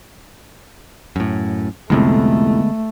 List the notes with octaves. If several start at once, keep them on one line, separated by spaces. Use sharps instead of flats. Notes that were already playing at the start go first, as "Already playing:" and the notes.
F#2 A2
C2 F2 D3 G#3 A3 B3